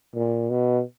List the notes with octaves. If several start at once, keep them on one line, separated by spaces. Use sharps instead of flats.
A#2
B2